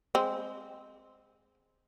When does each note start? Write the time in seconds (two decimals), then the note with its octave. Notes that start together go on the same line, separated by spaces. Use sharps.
0.15 G#3 C4